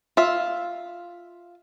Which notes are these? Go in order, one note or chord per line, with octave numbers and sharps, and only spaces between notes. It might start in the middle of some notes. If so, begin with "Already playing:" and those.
F4 E5